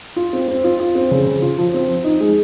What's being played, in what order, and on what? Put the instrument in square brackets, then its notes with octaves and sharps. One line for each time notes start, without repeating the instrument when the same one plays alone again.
[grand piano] F4
C4
C4
F4
F4
C4
C#3
C#3
F4
F3
C4
F3
D#4
G#3